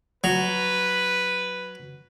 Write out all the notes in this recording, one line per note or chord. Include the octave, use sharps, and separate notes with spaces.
F#3 B4